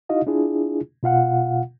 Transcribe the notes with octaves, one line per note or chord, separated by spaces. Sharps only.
D#4 E4 F#4 D#5 F5
D4 E4 F4 G#4
B2 F4 F5 F#5